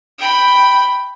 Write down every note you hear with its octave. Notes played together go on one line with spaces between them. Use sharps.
G5 B5